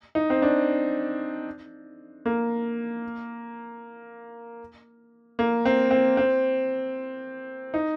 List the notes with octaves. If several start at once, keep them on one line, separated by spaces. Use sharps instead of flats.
D#4
C4
D4
A#3
A#3
C4
C4
C4
D#4